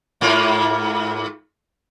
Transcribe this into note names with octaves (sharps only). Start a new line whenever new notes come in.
G#2 A#3 F4